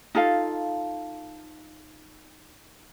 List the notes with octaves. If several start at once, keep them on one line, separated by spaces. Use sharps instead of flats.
D#4 F4 A4 F5